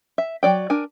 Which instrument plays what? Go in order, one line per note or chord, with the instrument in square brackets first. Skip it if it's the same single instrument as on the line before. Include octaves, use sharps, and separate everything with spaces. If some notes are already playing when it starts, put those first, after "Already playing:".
[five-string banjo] E5
F#3 D5 G5
D4 A#4 G#5